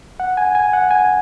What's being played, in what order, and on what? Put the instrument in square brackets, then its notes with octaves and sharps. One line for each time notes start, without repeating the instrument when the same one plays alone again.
[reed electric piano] F#5
G#5
G#5
F#5
G#5